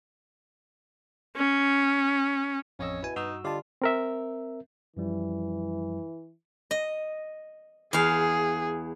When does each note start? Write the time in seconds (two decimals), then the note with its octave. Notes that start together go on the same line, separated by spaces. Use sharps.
1.37 C#4
2.79 A1 F2 C#4 C#5 D#5 E6
3.03 B2 E4 G#5
3.16 G2 D#4 F#4 E6
3.45 D3 G3 F4 D5 D#5 A5
3.82 C4 A#4 E5
4.97 F#2 E3 F3 G3
6.71 D#5
7.93 E2 G#4 F5